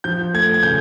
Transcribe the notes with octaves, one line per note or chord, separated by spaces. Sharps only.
F3 G6
A3 G#6
G#6
C#3 G6